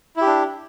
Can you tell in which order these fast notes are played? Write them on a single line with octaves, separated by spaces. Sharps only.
E4 G4 D4